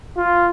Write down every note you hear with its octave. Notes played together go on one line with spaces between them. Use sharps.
F4